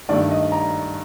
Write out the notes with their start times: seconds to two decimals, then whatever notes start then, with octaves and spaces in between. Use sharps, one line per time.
0.09 G2 D#3 A3 D5
0.31 D#5
0.52 A#5